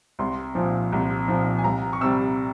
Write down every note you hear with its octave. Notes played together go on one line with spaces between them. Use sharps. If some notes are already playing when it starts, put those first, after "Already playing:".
C2 C6
A#2 F3
C2
A#2 F3
G#5
C2 A#5
C#6
C3 G3 E6